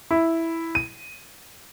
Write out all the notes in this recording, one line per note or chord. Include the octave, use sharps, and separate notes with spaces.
E4
D#7